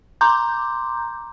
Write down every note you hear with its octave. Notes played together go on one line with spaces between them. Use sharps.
A#5 C6 D6 G6